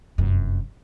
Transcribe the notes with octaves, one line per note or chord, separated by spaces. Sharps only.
F1 F#2